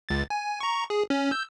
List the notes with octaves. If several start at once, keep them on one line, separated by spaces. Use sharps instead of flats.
C#2 A6
G#5
A#5 C#6
G#4
C#4
E6 G6